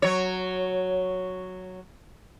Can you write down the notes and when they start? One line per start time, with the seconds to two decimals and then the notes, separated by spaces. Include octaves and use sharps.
0.02 F#3 C#5